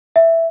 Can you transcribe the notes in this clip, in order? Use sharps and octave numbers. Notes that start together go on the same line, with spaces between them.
E5